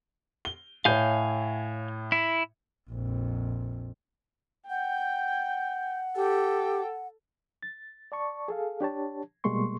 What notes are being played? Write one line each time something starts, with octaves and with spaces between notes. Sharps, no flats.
G7
A2 C#5 F5 G#5 G6
E4
A#1 F2
F#5 G5 G6
G4 A4 G5
A6
D5 A5 C#6
G#4 A4 F5
D4 G4 C#5 A5
B2 G3 G#3 A#3 C6 C#6